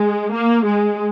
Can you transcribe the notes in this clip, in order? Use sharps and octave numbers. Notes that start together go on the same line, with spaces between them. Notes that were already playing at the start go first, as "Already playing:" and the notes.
Already playing: G#3
A#3
G#3